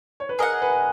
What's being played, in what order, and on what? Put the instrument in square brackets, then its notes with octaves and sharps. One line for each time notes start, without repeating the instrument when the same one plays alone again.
[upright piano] C#5
B4
[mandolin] G#4 D#5 F#5 [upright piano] A#4
[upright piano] B4